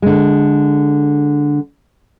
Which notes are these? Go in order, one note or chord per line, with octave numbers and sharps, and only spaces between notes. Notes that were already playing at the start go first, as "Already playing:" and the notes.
D3 G#3